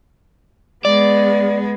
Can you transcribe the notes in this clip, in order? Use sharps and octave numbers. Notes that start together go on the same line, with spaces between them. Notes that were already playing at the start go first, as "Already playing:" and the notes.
G#3 B3 D5